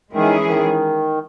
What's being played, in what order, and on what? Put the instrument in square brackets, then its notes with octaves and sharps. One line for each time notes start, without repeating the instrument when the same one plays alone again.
[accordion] D#3 [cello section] E3 G#3 C#4 E4 G#4
[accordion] D#3